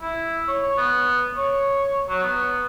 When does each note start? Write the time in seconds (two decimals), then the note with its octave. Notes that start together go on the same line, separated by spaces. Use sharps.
0.01 E4
0.48 C#5
0.78 B3
1.37 C#5
2.09 F#3
2.23 B3